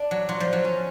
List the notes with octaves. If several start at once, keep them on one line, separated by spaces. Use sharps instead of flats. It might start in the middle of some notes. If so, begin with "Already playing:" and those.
Already playing: D4
F#3
F#3 F4
F3
F#3
C#4